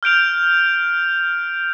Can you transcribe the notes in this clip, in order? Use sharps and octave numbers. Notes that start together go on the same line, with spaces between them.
F6 G6 D7 F7